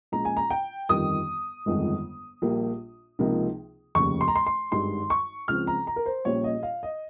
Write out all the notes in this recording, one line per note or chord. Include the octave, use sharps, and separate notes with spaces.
A#1 A#2 G#3 C#4 A#5
G#5
A#5
G5
G1 F2 D#3 G3 D#6
G1 F2 D#3 G#3
A#1 A#2 G3 A#3
C#2 C3 F3 A#3 D#4
F1 D#2 C#3 C#6
C6
A#5
C6
C6
G#1 G2 D#3 G#3 D#4 C6
C#6
C#2 C#3 F3 C4 F6
A#5
A#5
A#4
C5
A#1 A#2 G3 C#4 C#5
D#5
F5
D#5